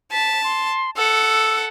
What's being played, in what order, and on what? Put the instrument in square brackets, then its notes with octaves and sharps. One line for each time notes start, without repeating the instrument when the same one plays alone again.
[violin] A5 [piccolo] B6
[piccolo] C6
[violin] A4 F#5 [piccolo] E6